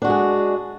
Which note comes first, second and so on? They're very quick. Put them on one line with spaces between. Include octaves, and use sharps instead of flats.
D4 F#4 G#3 G#4